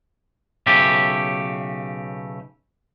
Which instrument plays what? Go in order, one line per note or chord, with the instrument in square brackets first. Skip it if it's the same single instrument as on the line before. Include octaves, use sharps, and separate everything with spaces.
[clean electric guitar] B1 C#3 A3 G4